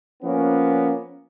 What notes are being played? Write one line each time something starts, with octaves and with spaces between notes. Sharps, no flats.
F3 A#3 B3 C#4